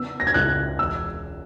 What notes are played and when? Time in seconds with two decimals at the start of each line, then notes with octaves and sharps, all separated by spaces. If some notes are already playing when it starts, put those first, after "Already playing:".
Already playing: C#3 B3 E6
0.20 A#6
0.27 G#6
0.34 C#2 F#6
0.79 E1 E6